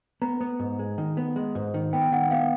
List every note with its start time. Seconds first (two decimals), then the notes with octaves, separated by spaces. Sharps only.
0.22 B3 A#5
0.41 B3
0.60 G#2
0.79 G#3
0.98 D#3
1.17 B3
1.36 G#3
1.55 G#2
1.74 D#3
1.93 B3 G5
2.12 D#3 F#5
2.31 B3 F5